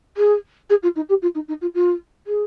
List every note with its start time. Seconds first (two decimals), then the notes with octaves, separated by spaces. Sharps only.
0.17 G#4
0.70 G#4
0.83 F4
0.96 D#4
1.09 G4
1.22 F4
1.35 D#4
1.48 D#4
1.61 F4
1.74 F4
2.27 G#4